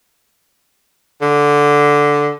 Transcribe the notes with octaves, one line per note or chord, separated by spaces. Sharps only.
D3